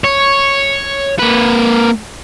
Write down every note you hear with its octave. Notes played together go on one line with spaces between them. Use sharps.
C#5
A#3 B4